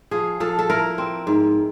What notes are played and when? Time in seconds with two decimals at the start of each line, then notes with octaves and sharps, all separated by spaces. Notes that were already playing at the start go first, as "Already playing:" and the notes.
0.11 F3 G#4
0.40 F3 A4
0.59 A4
0.70 E4 A#4
0.98 C4
1.27 G#2